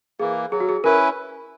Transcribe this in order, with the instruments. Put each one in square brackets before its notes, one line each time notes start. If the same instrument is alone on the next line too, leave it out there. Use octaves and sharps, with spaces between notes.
[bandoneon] E3 A#3 [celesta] G#4
[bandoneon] F#3 [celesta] G#4
[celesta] F#4
G#4
[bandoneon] C#4 E4 B4 [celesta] A#4